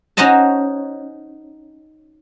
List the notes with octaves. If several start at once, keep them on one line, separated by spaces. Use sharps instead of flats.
C#4 D#4 F#4 C5 D#5 A5